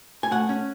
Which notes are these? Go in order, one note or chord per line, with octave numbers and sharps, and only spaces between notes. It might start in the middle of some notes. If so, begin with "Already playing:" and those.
G#5
A3 F#5
C#4